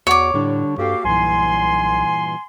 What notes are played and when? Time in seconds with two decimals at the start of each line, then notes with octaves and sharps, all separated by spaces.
0.07 E2 F#4 C#5 D5 F#5 D6
0.34 A2 D3 G3 D4
0.78 G2 A#3 F#4 G4 A4 F5 G5
1.05 B1 G2 A#2 E3 G#5 C6